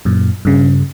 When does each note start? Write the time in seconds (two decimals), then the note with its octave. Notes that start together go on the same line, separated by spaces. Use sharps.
0.05 F#2 A#2
0.45 G2 C#3